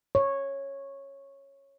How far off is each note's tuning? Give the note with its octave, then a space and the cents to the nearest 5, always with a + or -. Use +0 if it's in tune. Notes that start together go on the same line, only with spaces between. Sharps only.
C#5 -10